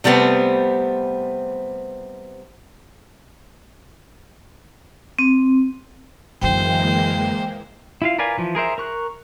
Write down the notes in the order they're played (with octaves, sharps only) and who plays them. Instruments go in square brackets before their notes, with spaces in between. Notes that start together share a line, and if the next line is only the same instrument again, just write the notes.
[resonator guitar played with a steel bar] C3 G3 A3 B3 C4
[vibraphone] C4
[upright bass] F#2 D3 [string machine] E3 G#3 A#3 [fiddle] C5 [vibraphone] G5
[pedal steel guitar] E4 F4 F5
A#4 B4 D5 F5 G#5
E3 F3
G#4 A#4 C5 E5
A#4 C#6 F#6